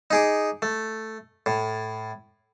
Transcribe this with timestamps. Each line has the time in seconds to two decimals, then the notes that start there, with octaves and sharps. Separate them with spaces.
0.11 D#4 G#4 D6
0.62 A3
1.46 A2